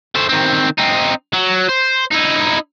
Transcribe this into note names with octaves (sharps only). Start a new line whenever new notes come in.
A3 C5
D#3 C4
C4 D#4
F#3
C5
D#4 E4